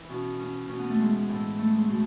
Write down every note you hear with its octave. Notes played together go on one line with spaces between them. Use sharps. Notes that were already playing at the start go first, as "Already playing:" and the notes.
Already playing: E3 E4 B4
B2 C#4
C#4
B2 C#4
B3
A3
G#3
A2 E3
A3
G#3
B2 A3